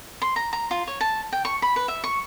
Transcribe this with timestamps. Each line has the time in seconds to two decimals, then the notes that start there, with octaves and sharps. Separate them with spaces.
0.22 C6
0.36 A#5
0.53 A#5
0.71 F4
0.87 C#5
1.01 A5
1.33 G5
1.45 C#6
1.62 B5
1.76 B4
1.88 E5
2.04 C#6